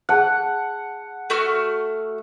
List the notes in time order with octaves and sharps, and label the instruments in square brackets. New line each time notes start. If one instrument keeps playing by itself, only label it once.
[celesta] G#4 A5 F#6 [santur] F#5
[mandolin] A3 F#4 F6